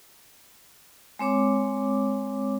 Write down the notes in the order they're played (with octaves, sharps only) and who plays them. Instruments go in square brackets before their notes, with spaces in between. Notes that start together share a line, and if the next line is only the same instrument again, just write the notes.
[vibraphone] G#3 C4 C#5 D6